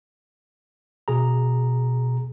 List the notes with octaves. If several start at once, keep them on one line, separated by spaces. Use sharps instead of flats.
B2 G#4 A#5